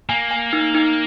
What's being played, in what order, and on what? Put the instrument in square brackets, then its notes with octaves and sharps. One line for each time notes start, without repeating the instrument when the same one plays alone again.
[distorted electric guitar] A#3 [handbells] G#5
[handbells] G#5
D#4
D#4